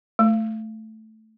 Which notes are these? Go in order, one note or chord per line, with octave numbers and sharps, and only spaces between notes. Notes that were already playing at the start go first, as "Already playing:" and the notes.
A3